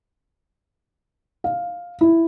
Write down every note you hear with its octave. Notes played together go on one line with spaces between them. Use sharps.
F5
E4